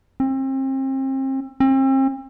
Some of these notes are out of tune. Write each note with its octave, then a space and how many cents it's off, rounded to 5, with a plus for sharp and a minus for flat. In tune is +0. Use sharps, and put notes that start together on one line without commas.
C4 +35
C4 +40